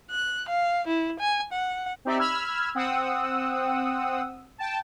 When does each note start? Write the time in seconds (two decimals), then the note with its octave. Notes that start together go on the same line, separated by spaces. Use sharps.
0.10 F#6
0.49 F5
0.87 E4
1.20 G#5
1.53 F#5
2.05 C4 D#4 G4 D5 E5
2.19 B5 E6 F6 G#6
2.75 C4 F#5 D#6 E6
4.58 G5 A5